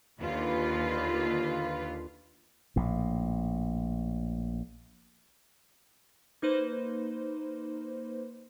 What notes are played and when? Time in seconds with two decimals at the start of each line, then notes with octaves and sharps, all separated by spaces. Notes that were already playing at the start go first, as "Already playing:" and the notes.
0.21 D#2 D3 F4 B4
2.76 A#1 A2
6.42 A#3 D#4 B4 C5